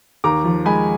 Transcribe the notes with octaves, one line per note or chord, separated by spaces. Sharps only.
D#2 A#5 D6
F3
G#3 G#5 B5